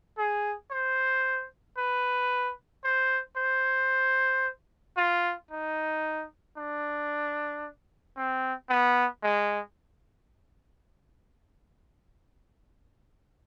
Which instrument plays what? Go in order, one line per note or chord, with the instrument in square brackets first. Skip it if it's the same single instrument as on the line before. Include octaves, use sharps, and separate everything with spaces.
[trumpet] G#4
C5
B4
C5
C5
F4
D#4
D4
C4
B3
G#3